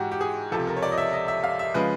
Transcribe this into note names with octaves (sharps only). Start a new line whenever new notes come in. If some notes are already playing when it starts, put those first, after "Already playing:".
Already playing: G#2 E3 G#3 F#4 G4
G4
G#4
C#2 C3 F3 A4
A#4
C#5
D5
D#5
E5
D#5
E5
F5
E5
C#3 F3 G#3 B4